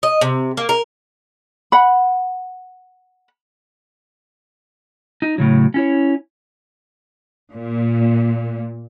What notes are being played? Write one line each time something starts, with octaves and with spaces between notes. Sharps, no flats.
D#5
C3
A#3
A#4
F#5 B5
D#4
A2 C#3 F#3
C#4 E4 C#5
A#2